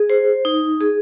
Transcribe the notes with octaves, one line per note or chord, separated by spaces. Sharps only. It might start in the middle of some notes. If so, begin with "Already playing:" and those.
Already playing: G#4
C5
D#4
G#4